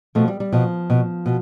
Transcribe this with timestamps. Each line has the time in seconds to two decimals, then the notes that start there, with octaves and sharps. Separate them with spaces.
0.15 B2 F3 A3
0.28 G3
0.40 G3
0.52 B2 F3
0.90 B2
1.26 B2